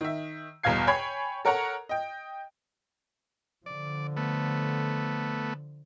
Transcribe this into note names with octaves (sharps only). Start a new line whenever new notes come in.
D#3 E5
G1 E2 B2 F5 G#6 C7
C#5 G5 G#5 B5 G#6
A4 A#4 C#5 F#5 A#5
D#5 G5
D3 F3 D5
A3 B3